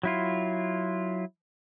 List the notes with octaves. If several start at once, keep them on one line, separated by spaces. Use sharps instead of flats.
F#3 E4 F4